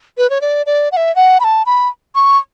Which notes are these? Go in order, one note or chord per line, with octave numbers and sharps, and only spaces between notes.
B4
C#5
D5
D5
F#5
E5
F#5
B5
A5
B5
C#6